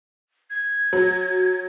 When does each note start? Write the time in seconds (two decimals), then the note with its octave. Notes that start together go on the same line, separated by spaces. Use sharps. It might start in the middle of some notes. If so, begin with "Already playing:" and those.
0.50 G#6
0.93 F#3